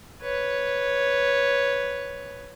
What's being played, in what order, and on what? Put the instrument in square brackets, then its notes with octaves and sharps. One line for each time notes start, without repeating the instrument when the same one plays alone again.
[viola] B4 C#5